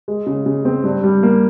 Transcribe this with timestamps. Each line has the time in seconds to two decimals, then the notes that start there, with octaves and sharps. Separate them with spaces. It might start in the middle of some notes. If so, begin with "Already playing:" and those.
0.08 G#3
0.26 C#3
0.46 C#3
0.65 C4
0.83 G2
1.04 G3
1.23 A#3